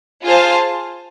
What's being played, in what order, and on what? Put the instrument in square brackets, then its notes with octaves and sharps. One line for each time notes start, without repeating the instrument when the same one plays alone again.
[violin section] F4 G#4 C5 F5 A5